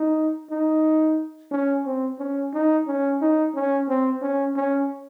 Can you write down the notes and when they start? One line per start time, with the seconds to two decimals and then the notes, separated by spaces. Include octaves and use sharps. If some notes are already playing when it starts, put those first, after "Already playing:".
Already playing: D#4
0.50 D#4
1.51 C#4
1.85 C4
2.19 C#4
2.53 D#4
2.87 C#4
3.21 D#4
3.55 C#4
3.88 C4
4.21 C#4
4.56 C#4